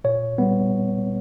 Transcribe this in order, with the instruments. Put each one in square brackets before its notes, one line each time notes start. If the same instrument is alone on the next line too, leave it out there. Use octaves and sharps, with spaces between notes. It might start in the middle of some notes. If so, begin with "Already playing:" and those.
[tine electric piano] A#2 C#5
G3 B3